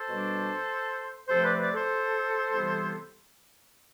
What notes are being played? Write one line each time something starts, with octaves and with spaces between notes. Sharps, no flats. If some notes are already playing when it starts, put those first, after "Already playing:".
Already playing: A4 C5
B2 G3 D4
C3 F3 A3 C4 A4 C5
B4 D5
B4 D5
A4 C5
C3 E3 G3 B3 E4